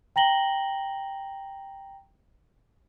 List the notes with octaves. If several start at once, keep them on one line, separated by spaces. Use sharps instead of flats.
G5 A#5 A#6 F#7 G7